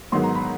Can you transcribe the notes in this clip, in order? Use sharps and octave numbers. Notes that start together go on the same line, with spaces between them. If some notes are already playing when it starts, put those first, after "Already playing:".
G#2 D#3 F#3 B3 C6
A#5
B5